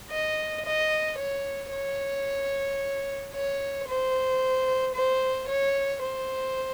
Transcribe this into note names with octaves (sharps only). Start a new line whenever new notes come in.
D#5
D#5
C#5
C#5
C#5
C5
C5
C#5
C5